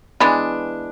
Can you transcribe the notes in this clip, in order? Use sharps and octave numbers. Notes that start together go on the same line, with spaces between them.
E3 G#3 B3 D4